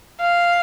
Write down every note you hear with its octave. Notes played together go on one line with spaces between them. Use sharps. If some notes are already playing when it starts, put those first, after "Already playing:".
F5